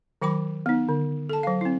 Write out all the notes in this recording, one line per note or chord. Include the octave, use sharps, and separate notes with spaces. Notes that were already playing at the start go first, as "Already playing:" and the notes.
D#3 F#3 G5 B5 D6
B3 D#4
D3
A4 A5
F#3 F5
C4 E4